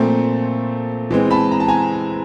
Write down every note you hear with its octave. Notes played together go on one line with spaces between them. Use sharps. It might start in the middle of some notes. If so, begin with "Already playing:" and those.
Already playing: A#2 F3 A3 C4 A#5
E3 G#3 C4
A5 B5
A#5
A5
G#5 A#5